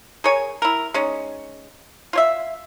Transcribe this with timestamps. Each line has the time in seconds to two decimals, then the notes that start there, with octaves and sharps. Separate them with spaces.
0.24 G#4 A#4 C#5 G#5
0.62 E4 A#4
0.94 G#3 C#4 D#4
2.13 F4 C#5 E5